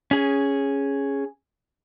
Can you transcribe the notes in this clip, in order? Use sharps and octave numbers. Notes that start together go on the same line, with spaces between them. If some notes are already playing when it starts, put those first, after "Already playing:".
C#4 G#4